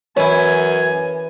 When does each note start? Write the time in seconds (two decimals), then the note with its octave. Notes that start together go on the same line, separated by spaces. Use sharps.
0.17 F#2 E3 E4 C#5 G#5